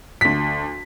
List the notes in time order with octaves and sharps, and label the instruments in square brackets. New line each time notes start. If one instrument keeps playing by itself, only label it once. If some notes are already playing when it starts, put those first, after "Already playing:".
[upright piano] D2 B6